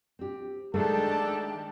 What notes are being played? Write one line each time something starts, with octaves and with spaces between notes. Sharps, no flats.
C4 G4
D#3 G#3 A3 D4 G4 A4 A5